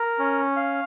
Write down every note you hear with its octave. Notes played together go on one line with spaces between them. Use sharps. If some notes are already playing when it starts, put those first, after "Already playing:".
Already playing: A#4
C#4
F5